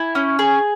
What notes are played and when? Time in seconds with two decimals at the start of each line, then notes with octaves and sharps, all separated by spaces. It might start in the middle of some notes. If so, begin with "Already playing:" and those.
Already playing: E4 G#5
0.15 C#4
0.39 G#4